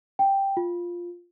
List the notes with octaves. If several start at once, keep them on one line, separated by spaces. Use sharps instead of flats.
G5
F4